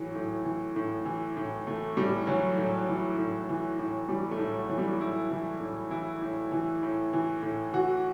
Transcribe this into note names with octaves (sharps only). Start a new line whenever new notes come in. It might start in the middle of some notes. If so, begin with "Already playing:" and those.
Already playing: A2 E3 F#3
A2
E3
A2
E3
A2
E3 A3
A2 G3
E3 F#3
A2
E3
A2
E3
A2
E3 G3
A3
A2
F#3
E3
G3
A2 E4
E3
A2
E3 E4
A2
E3
A2
E3
A2
E3 F#4